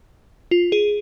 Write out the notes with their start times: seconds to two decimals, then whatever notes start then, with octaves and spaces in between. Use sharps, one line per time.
0.51 F4
0.72 G#4